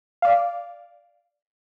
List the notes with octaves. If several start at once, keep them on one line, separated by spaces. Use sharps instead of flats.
D5 F5